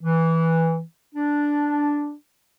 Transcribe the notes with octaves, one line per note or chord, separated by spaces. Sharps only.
E3
D4